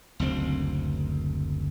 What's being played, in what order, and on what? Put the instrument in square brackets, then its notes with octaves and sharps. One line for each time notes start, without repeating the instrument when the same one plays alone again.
[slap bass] F#1 D2 C4